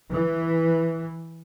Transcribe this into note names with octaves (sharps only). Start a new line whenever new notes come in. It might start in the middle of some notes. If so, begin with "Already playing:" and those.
E3